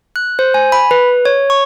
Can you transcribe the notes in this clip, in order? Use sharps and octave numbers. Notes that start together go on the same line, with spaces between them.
F#6
C5
G#5
B5
B4
C#5
C#6